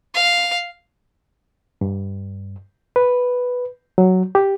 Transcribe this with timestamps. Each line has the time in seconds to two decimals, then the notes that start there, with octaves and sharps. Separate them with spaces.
0.14 F5
1.81 G2
2.96 B4
3.98 F#3
4.35 G4